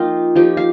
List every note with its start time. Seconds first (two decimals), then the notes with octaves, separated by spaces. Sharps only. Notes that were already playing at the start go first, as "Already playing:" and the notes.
Already playing: F3 A#3 D#4 F4 D#5 G5
0.35 F3 D#4 G4
0.57 F5